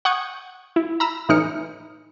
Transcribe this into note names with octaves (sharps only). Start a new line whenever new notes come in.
F#5 C#6 D#6 G6 G#6
E4
A#5 B5 E6 B6
A2 E3 D#4 F6 C#7